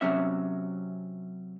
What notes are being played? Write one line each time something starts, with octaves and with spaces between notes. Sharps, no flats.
C3 F3 F#3 C#4 E5